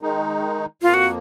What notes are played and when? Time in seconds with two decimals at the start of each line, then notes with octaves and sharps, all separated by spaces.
0.01 D#3 G#3 D#4
0.82 F2 F3 A#3 F4
0.94 F#4